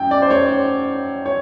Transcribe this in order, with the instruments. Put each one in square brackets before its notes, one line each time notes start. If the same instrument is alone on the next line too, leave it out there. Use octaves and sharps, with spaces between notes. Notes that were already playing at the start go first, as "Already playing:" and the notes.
Already playing: [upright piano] F#2 G5
D5
C5
C#5
C#5